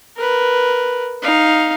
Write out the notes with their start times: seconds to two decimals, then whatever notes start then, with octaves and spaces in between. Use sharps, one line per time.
0.17 A#4 B4
1.22 D#4 F5